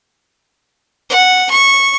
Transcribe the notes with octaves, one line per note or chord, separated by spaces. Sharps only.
F#5
C#6